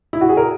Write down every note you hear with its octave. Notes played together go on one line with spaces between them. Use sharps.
E4
F#4
G#4
A#4